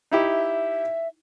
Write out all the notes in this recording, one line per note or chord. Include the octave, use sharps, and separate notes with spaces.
D#4 E4 G4 E5